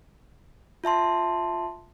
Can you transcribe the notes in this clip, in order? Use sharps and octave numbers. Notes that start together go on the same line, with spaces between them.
F4 E5 A5 C6